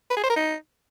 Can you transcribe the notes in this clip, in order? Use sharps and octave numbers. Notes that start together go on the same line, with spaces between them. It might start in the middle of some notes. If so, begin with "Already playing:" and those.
B4
G#4
C5
A#4
D#4